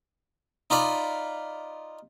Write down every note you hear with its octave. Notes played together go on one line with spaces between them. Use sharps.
D#4 F4 D5 B5